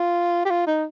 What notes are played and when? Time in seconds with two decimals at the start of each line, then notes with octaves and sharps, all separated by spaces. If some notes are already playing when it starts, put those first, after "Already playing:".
Already playing: F4
0.45 G4
0.50 F4
0.67 D#4